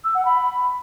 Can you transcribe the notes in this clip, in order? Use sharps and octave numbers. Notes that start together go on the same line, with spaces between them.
E6
F#5
B5